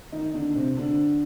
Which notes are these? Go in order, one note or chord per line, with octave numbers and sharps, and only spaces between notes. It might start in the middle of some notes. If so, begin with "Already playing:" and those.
D#3 D#4
D3 D4
D4
C3 C4
D3 D4